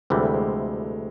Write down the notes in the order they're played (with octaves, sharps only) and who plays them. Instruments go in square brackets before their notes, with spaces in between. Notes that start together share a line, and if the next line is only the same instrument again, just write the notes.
[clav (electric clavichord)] D2 C3 E3 G3 [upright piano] G#3
[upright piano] A3
G#3